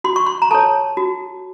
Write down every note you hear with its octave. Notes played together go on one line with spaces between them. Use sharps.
F#4 C6
C#6
C6
A#5
A4 C#5 A5
F#4